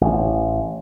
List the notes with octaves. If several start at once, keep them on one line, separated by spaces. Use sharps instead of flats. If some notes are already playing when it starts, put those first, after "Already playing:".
A1